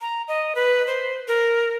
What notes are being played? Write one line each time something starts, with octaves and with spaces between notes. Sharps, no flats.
A#5
D#5
B4
C5
A#4